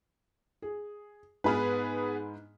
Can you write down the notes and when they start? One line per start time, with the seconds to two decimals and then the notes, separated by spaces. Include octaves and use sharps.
0.62 G#4
1.44 G#2 B3 G#4 B4 B5 F6